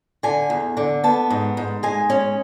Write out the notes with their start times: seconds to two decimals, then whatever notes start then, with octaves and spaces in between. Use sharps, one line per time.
0.23 D3 G#5
0.50 E2
0.77 D3
1.04 B3 A5
1.30 G#2
1.57 G#2
1.83 G#3 G#5
2.10 C#4